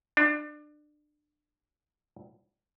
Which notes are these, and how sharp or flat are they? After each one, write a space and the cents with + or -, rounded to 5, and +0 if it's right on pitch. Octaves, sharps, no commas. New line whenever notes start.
D4 +25